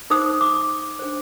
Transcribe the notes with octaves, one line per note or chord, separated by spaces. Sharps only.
D#4 G#4 C5 D#6
D6
D4 G#4 C5